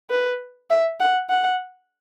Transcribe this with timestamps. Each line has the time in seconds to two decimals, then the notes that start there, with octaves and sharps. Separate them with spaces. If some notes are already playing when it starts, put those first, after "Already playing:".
0.10 B4
0.70 E5
1.00 F#5
1.30 F#5